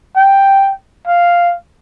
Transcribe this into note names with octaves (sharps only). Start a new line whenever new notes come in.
G5
F5